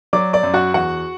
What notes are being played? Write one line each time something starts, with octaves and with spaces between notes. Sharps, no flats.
F#3 D5 D6
D5 D6
F#2
F#4 F#5
E2 F#4 F#5